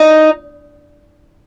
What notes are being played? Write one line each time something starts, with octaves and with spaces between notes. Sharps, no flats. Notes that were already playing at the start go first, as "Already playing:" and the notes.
Already playing: D#4